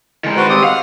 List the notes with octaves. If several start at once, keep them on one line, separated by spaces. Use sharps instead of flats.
D#3 G#3
F#4 B4 C5
C4 G4 D#6
F5 F#5